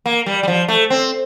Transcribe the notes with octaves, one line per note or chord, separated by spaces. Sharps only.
A#3
G3
G3
F3
A3
C4